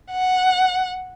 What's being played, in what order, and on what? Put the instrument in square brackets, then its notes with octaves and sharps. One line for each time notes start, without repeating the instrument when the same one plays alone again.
[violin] F#5